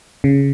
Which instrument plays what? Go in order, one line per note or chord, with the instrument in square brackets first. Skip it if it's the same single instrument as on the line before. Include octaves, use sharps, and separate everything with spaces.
[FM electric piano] C#3